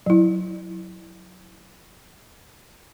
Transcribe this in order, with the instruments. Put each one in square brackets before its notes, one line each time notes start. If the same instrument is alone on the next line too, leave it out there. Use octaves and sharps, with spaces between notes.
[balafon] F#3 E4